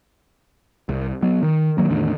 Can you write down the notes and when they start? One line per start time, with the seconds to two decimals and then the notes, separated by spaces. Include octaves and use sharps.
0.89 C2
1.22 F#3 B3
1.43 D#3
1.78 D#3 F#3 A#3
1.90 E2 A2 D3 D#3